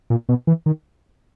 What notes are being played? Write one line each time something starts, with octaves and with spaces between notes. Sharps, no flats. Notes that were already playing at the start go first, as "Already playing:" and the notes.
A#2
B2
E3
D#3